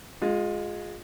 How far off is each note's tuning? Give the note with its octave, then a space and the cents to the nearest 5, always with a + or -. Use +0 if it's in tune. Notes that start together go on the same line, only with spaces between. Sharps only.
G#3 +0 F4 +30